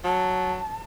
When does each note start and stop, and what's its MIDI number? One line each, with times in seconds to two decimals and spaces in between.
0.04 0.60 54
0.04 0.83 81